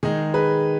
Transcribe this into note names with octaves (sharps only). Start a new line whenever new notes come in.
D#3 G#3 D#4 G#4
G#4 B4